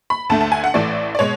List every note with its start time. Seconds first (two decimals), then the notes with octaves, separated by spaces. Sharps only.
0.10 B5
0.30 D2 D3 A3 A5
0.41 A5
0.52 G#5
0.64 F#5
0.74 A1 A2 E3 A3 D5
1.15 D5
1.19 B2 G#3 C#5